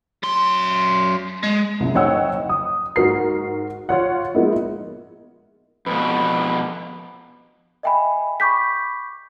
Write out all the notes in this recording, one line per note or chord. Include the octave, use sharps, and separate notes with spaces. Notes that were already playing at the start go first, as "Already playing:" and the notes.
F#2 C6
G#3
C2 C#3
F#1 D#4 C#5 F#5 G5 E6
D#6
G#2 F#4 A#4 C7
F4 C#5 F#5
F3 G#3 A#3 B3 D#4 E4
F2 B2 B4
D#5 E5 G5 G#5 B5
B5 C#6 D6 G6 B6